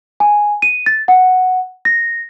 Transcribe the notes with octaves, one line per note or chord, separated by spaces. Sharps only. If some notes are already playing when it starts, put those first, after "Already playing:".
G#5
D#7
A6
F#5
A#6